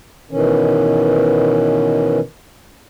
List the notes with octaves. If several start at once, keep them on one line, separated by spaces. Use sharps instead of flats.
B2 D#3 E3 C#4